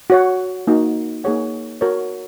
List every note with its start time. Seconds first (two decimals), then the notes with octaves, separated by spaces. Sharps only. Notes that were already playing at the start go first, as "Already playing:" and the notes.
0.10 F#4 C#5 F#5
0.67 A#3 D#4 F#4
1.24 A#3 D#4 G#4 C#5 F#5
1.81 F#4 A#4 C#5